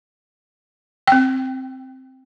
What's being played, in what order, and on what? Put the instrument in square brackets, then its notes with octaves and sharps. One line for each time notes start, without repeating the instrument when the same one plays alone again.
[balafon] C4 G5